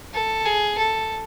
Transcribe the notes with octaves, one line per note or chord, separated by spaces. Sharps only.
A4
G#4
A4